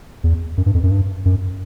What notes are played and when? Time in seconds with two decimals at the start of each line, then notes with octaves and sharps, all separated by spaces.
0.24 E2
0.57 F#2
0.66 G2
0.74 F2
0.83 F#2
0.91 G2
1.25 F#2